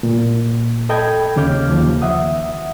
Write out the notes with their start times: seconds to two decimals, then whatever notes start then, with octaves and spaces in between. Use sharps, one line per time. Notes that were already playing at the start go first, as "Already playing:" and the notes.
0.03 A#2
0.89 A4 D#5 G5 B5 G6 G#6
1.36 D#2 C#3 D6 F6 G6
1.70 D#2 F3
2.02 E5 F#5 D#6